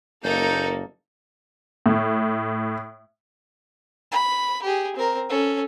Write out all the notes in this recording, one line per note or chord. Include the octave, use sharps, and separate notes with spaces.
F#1 A#3 D#4 A4 G6
A2
B5
G4 G#4
C4 A#4
C#4 A4